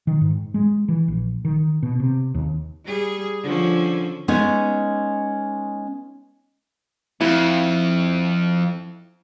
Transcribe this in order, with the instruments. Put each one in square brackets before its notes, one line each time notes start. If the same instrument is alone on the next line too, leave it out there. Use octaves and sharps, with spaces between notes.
[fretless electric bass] D#3
G#2
G#3
E3
A#1
D#3
B2
C3
D#2
[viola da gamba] G3 G#4
D3 F3 C#4
[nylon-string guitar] G#3 B3 C#4 D#4
[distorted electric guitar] F2 [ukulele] E4